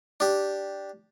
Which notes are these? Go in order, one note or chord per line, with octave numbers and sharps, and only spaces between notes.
D4 G4